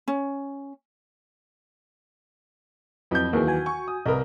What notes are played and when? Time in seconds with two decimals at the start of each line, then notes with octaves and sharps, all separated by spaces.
0.08 C#4
3.11 F2 F#3 E4 B4 G6
3.33 D#2 E3 F#3 A#3 G#4
3.47 F#4 G#5
3.66 C#6
3.88 D#6
4.06 C2 A#4 B4 D#5